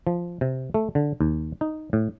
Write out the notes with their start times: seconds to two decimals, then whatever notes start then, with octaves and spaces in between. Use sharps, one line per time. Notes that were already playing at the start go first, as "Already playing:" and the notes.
0.07 F3
0.41 C3
0.74 A3
0.95 D3
1.21 D#2
1.61 D#4
1.93 A2